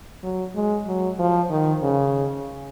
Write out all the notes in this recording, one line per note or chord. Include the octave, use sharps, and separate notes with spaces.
F#3
G#3
F#3
F3
D#3
C#3